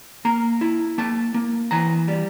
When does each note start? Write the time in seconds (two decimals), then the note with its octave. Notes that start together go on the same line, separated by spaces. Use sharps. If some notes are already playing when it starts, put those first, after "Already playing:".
0.25 A#3 A#5
0.61 E4
0.98 A#3 A5
1.34 A#3
1.71 E3 A#5
2.08 G3